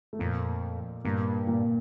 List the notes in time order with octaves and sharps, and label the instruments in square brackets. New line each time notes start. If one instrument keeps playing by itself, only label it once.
[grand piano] A3
[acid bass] F2 [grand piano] A#2 A#3
[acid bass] G2 [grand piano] A#2 A#3
[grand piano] A#2 A#3